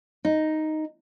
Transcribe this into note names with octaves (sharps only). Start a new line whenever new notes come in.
D#4